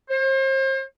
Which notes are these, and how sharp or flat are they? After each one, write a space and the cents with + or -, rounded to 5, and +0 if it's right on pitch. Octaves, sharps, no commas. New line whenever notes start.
C5 +40